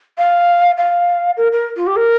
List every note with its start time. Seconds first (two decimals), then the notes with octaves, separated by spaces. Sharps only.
0.18 F5
0.78 F5
1.37 A#4
1.52 A#4
1.76 F4
1.87 G4
1.96 A#4